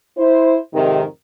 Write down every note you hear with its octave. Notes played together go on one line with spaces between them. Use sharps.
E4 C5
F2 G#2 C3 D#3